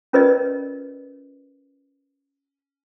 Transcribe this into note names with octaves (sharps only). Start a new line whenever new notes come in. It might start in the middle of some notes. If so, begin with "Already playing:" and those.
C#4 F4 A#4 B4 D5 D#5